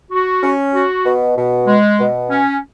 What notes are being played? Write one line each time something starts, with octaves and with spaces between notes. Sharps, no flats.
F#4
C#4
F#4
B2
B2
G#3
B2
C#4